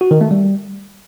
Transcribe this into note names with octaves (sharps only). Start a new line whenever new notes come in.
F#4
D#3
A3
G3